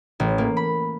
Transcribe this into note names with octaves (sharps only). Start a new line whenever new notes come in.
A1
A#3
B5